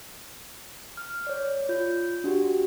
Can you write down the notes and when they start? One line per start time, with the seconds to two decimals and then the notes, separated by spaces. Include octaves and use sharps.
0.97 F6
1.27 C#5 D5
1.69 F4 G6
2.24 D4 F#4 G4